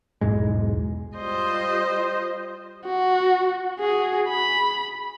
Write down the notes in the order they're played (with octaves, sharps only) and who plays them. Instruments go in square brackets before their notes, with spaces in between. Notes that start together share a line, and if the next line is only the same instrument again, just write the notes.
[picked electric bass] B1 E2 G#2 G#3
[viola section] G3 F4 C5 D#5
[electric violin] F#4
F#4 G#4
B5